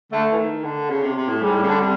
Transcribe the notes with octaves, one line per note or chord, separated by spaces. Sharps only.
D3 A3
E3
D#3
D3
C#3
C3
C3
A2
G#2 G3
A2
C#3
D3
C3